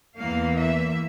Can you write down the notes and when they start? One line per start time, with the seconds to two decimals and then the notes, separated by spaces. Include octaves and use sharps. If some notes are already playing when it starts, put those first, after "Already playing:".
0.17 E2 E3 A#3 F5
0.55 E5